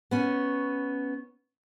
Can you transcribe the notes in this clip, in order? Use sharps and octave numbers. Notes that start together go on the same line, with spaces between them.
B3 C#4